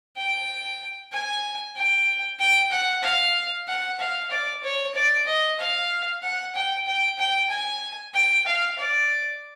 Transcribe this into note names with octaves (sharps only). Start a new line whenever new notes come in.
G5
G#5
G5
G5
F#5
F5
F#5
F5
D5
C#5
D5
D#5
F5
F#5
G5
G5
G5
G#5
G5
F5
D5